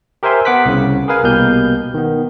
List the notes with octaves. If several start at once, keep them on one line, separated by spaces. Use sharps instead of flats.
G4 A#4 C5 E5 G#5 C6
B3 F#5 D6 F#6 B6
C2 C#3
G#4 A#4 B4 F5 G#5
C2 B2 A#3 G4 F6 G6
D#3 B3